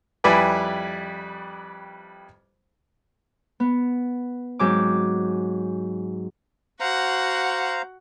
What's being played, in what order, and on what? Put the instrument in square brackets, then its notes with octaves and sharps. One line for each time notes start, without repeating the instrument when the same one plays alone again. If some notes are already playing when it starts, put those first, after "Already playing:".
[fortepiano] F2 G3 E4 B4 D5 G#5
[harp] B3
G#2 F#3 C4 D6
[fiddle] F#4 F#5 [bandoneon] C5 F5 A#5